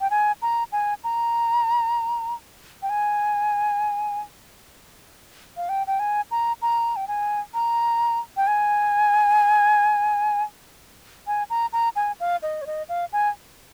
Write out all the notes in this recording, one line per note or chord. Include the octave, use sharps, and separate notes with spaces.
G5
G#5
A#5
G#5
A#5
G5
G#5
F5
G5
G5
G#5
A#5
A#5
G5
G#5
A#5
G5
G#5
G#5
A#5
A#5
G#5
F5
D#5
C#5
D#5
F5
G#5